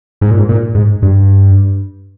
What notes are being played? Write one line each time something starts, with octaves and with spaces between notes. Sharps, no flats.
G#2
A#2
G#2
A#2
G#2
G2